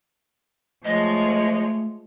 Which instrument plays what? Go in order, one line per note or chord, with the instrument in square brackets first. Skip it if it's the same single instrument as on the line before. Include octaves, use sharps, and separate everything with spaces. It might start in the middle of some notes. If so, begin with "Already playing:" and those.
[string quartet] F3 G#3 C#5 [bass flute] A3 [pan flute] D#5